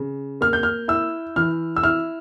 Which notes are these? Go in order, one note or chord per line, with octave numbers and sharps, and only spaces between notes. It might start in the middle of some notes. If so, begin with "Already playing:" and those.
Already playing: C#3
A#3 F6
G6
F6
E4 E6
E3 F6
E6
E4 F6